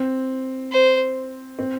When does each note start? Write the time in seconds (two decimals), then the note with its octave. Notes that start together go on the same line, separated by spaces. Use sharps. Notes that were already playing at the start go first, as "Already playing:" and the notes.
Already playing: C4
0.72 C5
1.59 C4